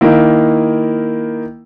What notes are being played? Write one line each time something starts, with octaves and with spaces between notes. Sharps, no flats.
D#3 A#3 E4